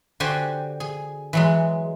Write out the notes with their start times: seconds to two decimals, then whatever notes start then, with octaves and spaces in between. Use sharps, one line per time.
0.20 D3 F#4 G4 C5 G#5
0.80 G#4
1.33 E3 F#3 G#3